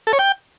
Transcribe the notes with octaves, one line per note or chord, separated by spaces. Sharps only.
A4
C#5
G5